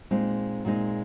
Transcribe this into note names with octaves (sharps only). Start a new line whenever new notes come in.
A#2 G#3 C4 D#4
A#2 G#3 C4 D#4